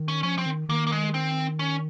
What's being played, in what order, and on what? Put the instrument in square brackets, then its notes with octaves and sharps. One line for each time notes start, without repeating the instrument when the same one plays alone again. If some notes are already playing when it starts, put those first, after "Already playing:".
Already playing: [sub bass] D#3
[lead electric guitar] C#4
[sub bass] F3 [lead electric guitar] C#4
[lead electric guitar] C4
[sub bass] D#3
[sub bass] D#3 [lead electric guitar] A#3
[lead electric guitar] A#3
G#3
C4
C#4